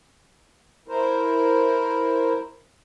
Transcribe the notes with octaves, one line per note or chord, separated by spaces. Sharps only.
E4 A#4 C5